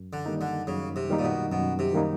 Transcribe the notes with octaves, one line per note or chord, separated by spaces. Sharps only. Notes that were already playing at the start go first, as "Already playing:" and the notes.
Already playing: F#2
D3
D#3 G3 A#3 D#4
D3
F#2 C#3
C3
D#3 G3 A#3 D#4
A#2
B2
F#2 B2
C3
D#3 G3 A#3 D#4